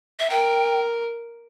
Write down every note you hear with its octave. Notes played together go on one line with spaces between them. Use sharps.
E5
A#4 G5